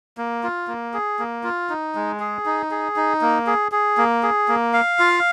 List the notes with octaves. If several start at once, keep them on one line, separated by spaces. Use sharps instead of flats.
A#3
F4
A#3
G#4
A#3
F4
D#4
G#3
G#4
D#4
G#4
D#4
A#3
G#4
G#4
A#3
G#4
A#3
F5
F4